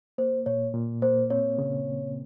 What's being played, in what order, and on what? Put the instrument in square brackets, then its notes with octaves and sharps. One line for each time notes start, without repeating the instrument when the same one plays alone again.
[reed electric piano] A#3 [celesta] C5
[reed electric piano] A#2 [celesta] C#5
[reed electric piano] A#2
[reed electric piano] A#3 [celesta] C5
[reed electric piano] C4 [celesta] C#5
[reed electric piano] C#3